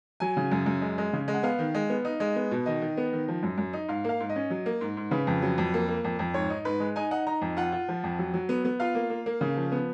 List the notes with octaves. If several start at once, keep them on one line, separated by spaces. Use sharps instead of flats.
F#3 G#5
C#3
F#2
F#2
G#3
G#3
C#3
G#3
F#5
B3 F5
D#3
G#3
B3
D#4
G#3
B3
B2
D#3 D#5
D#3
B3
D#3
F3
F#2
F#2
D#4
G#2 F5
A#3 F5
G#2
D#5
C#4
F#3
A#3
G#2
G#2
C#3 B4
F2
F#3
F2
A#3
A#3
F2
F2
G#2 C#5
D#4
G#2 B4
G#3
D#4 G#5
D#4 F#5
D#4 A#5
F2
F4 F#5
F4
F3
F2
F#3
F#3
B3
B3
F4 F5
A#3
A#3
A#3
C#3
F3
B3